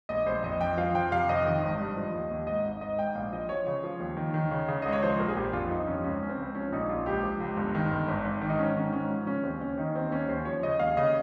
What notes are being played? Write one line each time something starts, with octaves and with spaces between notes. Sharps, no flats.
A#1 D#5
A#1 C5
F2 D#5
F2 G5
F3 F5
F2 G5
C3 F5
F2 D#5
D#3
G#1
G2
F3
D#2
D#2
G#2 D#5
G#1 D#5
G#2 D#5
G#2 G5
A#1 F5
F3 D#5
F3 C#5
C#3
F3
D#2
D#3
D#3
C#3
C#3
C#2 D#5
C#5
F3 C5
A#1 A#4
G#4
A#1 G4
F2 F4
G1 D#4
F2 C#4
C#2 C#4
C#2 C#4
C4
C#2
F3 C#4
A#1 D#4
A#1 F4
C#2 G4
F3
C#2
G1
D#3
G1
G#1
G#1
D#3
D#4
G#2 C#4
D#3 C#4
G#2 C#4
F3
C#3 C#4
D#2 C4
D#2 C#4
D#3 D#4
D#2 C4
D#2 C#4
D#2 C5
F3 C#5
C#3 D#5
D#2 F5
C#3 D#5